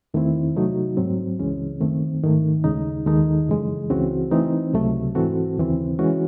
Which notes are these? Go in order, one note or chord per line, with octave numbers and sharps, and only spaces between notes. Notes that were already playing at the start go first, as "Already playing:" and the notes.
E2 D#3 A3 C4 E4
C3 F#3 A3 D#4 F#4
G#2 F#3 C4
C#2 C#3 E3 G#3 C#4
F#2 D#3 A3 C4
G#2 D#3 A3 D#4
D#2 C#3 G#3 D#4
D#2 D#3 G#3 D#4 A4
F#2 C#3 E3 G#3
C#2 C#3 E3 C4 F#4
E3 A3 C4 D#4
C#2 C3 F#3 A3
G#2 E3 C4 F#4 A4
D#2 C#3 E3 C4
E3 G#3 C#4 F#4